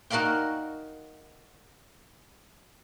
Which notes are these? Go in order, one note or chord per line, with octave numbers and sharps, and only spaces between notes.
D#4 F#4 A#4 D5 F5 G5